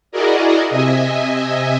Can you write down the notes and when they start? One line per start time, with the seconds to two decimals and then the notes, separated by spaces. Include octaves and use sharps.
0.12 E4 F#4 G#4 A#4 D5 D#5
0.70 C3 D#5 E5 G#5